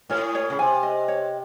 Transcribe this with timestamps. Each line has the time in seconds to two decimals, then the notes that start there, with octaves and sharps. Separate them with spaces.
0.10 A2 C#5
0.35 C#5
0.50 C#3
0.59 C3 G#5
0.83 D#5
1.08 C#5